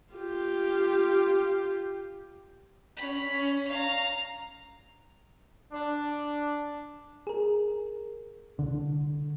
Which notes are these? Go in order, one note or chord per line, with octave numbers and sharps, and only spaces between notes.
F4 G4
C#4 B5
C#4
F5 A#5
D4
G#4 A#4
C2 D3